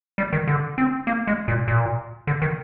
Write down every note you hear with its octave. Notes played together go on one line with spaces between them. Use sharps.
G3
D#3
D3
C4
A#3
G#3
A#2
A#2
D3
D#3